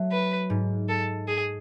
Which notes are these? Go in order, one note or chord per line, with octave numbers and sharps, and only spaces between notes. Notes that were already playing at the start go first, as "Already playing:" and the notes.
Already playing: F#3 A3
B4
G#2
A4
G#4